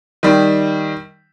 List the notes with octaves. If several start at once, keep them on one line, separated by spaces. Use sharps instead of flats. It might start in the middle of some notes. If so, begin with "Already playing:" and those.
D#3 G3